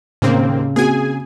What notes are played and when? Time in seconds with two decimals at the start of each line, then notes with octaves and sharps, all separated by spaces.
0.22 D#2 A2 C#3 A#3 C4
0.76 A#3 C4 F#4 G#4 G#5